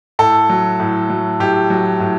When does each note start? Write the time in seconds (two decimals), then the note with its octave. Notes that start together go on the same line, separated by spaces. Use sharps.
0.19 A2 A4
0.49 F#3
0.80 A2
1.10 F#3
1.40 A2 G4
1.70 F#3
2.00 A2